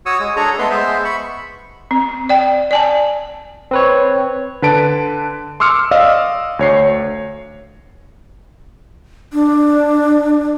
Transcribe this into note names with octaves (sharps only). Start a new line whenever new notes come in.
F#4 C#5 C#6 D#6 E6
G#3
D4 G#4 A4 C#5 A#5 C#6
G#3 A3 B3 B4 C6
G#3 B3 C5 E5
B5 C#6
C4
D5 G5
D5 G#5 A5
C4 B4 C#5
D3 B4 A5 D7
C6 D6 E6 F6 C#7
D5 D#5 F5 E6
D2 C#5 C7
D4